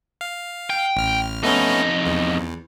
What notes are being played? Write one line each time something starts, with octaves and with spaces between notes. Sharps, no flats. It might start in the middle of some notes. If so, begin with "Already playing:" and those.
F5
G5
A1 F6
F2 A3 B3 C#4 D#4
E2